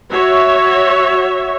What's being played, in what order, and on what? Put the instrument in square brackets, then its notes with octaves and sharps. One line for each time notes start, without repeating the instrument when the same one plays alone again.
[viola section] F#4 C#5 E5